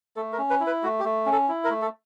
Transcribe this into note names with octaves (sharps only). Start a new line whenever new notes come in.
A3 A4
A#4
C#4
B4
E4
B4
A3 F#4
G4
A3
C#4
A4
E4
A#4
A3
A4